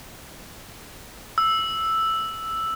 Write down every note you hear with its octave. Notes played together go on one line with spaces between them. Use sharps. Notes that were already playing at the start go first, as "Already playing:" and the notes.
E6